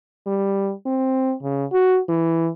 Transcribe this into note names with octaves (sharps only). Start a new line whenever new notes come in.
G3
C4
C#3
F#4
E3